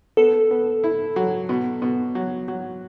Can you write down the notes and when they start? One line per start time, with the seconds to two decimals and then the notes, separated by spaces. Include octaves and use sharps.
0.17 B3 A4
0.51 B3
0.84 E4
1.16 F#3
1.49 B2
1.82 B2
2.15 F#3
2.48 F#3